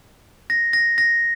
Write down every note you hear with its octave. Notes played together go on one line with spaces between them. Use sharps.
A#6
A#6
A#6